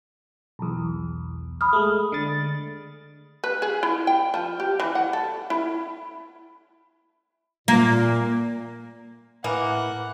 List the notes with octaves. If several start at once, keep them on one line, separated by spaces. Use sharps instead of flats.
B1 E2
B5 D#6 F6
G#3 A3
D3 A6
B4
G#4
E4
G5
F3
G4
E3
F#5
A4
E4
A#2 A#3
A2 E3 A#3 F#5